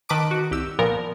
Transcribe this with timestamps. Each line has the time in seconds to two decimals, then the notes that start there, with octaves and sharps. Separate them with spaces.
0.09 D#3 B4 D#5 A5 D6 D7
0.31 F#4
0.51 C2 G4 E6
0.79 A#2 F3 B3 A#4